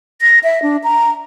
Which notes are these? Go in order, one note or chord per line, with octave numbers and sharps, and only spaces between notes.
A#6
E5
D4
A#5